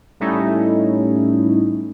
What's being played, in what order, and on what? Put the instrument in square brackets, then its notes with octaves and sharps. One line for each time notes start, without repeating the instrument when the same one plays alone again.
[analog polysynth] A2 G3 A3 C#4 D#4 E4